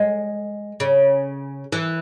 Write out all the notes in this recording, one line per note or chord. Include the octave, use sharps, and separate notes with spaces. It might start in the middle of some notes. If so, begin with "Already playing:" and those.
Already playing: G#3
C#3
E3